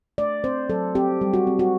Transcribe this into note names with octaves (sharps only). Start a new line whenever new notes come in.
A3 D5
C4 C5
F#3 A4
C4 G4
G3
F#4
C4
F#4